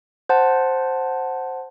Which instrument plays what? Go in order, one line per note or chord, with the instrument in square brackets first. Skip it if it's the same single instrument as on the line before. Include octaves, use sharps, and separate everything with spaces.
[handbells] C5 F#5 A5